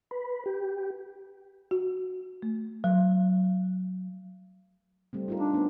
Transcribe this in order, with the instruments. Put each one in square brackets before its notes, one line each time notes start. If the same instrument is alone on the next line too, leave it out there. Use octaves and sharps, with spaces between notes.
[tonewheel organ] B4
G4
[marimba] F#4
A3
F#3
[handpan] G3 A3 C4
D#4 F4 A#4
[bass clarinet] D4
[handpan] A3 B3 C#4